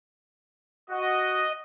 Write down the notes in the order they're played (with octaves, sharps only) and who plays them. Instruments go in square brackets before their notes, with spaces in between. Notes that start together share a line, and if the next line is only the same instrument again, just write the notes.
[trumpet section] F#4 [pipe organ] D#5